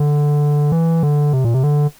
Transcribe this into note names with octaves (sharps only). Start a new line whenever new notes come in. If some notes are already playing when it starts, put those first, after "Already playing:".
Already playing: D3
E3
D3
C3
A#2
C3
D3